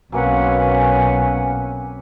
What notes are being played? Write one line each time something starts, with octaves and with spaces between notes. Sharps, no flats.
B1 F#3 A#3 C4 C#4 B4 F#5 G#5